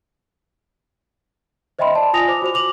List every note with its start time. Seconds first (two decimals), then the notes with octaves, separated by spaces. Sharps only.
1.79 C5 D#5 E5 G5 B5 C6
1.95 D5 A5
2.13 F4 G#5 D#6 A#6 F7
2.28 C5 D6
2.42 F#4 C5 F7
2.54 D6 F7 F#7